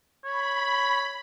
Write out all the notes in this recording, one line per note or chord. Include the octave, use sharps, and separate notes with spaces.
C#5 B5